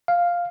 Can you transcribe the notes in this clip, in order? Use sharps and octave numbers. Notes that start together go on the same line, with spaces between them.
F5